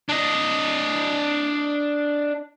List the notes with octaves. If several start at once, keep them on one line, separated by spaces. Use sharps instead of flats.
D4 D#5